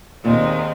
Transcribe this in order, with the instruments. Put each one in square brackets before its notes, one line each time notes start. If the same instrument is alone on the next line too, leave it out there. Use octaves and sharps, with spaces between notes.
[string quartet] D#2 D#3 G#3 C4 [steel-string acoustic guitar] A#2